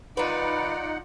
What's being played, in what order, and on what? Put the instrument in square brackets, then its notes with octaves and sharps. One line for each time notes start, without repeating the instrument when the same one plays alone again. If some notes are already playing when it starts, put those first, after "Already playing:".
[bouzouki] D#3 B4 [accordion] D#4 F#5 [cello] F4 D5